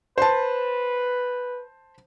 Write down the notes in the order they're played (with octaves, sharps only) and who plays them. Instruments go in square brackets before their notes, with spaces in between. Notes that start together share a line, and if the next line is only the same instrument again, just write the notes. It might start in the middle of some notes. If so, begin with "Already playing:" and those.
[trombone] B4 [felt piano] C5 A5